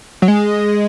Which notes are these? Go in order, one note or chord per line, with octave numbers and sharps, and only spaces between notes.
F#3
G#3